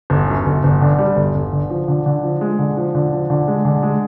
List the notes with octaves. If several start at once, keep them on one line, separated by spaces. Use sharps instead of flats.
G1
F#2
G1
G1
D3
G3
G1
G1
D3
F3
D3
D3
F3
G#3
D3
F3
D3
F3
D3
G#3
D3
G#3